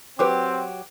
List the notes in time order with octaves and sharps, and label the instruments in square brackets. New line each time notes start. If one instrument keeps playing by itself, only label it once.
[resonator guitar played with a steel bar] F#3 G4 [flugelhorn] C4 [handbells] B4 C5 D6